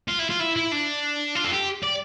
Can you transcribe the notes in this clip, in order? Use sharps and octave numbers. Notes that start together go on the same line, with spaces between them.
F4
E4
F4
E4
E4
D4
F4
A4
G4
D5